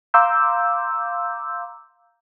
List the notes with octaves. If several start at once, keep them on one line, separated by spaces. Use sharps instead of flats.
F5 A#5 C6 D6 E6 G6